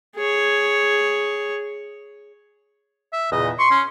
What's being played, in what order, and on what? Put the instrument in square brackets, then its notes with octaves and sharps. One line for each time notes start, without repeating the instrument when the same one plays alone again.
[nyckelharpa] G#4 C#5
[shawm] E5
[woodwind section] E2 A#2 C#3 [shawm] D#5
[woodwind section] C6 [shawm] C#6
[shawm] C#4